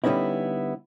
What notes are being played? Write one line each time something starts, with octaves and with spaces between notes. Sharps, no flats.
D3 G3 B3 C#4 D#4 E4